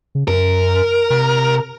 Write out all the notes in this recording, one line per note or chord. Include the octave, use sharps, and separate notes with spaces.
C#3
F#2 A#4
C3